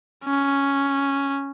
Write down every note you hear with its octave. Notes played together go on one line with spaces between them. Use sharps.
C#4